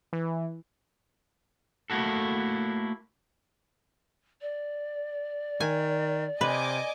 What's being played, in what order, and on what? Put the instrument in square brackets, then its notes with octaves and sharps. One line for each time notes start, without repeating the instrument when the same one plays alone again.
[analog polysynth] E3
[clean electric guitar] A3 A#3 E4 F#4 A4
[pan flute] D5
[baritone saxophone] D#3 [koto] G#5
[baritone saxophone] C3 [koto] B4 [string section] D#5 G#5 D6